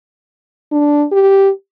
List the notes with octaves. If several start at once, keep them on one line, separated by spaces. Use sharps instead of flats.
D4
G4